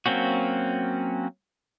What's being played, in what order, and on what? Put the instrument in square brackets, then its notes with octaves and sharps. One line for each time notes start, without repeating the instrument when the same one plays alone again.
[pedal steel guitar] F#3 A#3 C4 C#4 F#4